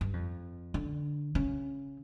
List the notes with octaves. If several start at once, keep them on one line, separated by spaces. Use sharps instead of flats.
G2
F2
D3
C#3